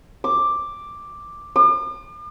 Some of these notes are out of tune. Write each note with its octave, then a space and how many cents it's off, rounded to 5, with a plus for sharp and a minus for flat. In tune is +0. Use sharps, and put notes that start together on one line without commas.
D6 +5
D6 +45